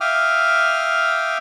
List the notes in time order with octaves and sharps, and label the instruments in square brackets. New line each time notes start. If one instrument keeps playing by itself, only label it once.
[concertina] E5 F5 G5 D6 D#6 F6